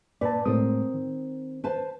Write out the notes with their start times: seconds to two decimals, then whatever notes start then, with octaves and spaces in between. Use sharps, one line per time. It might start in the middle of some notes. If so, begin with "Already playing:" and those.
0.21 A#2 B4 D5 A5
0.45 A2 G#3 C4 A#4 D#6
0.94 D#3
1.64 B4 C5 A5